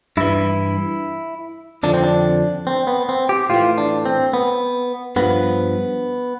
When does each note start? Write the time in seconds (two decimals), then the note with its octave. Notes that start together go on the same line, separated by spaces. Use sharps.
0.17 G2 E3 E4
1.83 F2 D3 F3 D4
1.94 C4
2.04 D4
2.67 C4
2.87 B3
3.09 C4
3.29 G4
3.50 A2 E3 F4
3.78 D4
4.06 C4
4.33 B3
5.16 G2 F3 B3